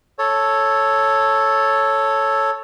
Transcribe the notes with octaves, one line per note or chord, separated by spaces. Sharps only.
A4 C#5